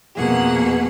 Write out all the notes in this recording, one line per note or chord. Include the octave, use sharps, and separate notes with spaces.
F2 B2 A#3 G#4 F#5